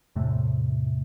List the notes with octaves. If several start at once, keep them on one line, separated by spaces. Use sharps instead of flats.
E2 A2 C3 A3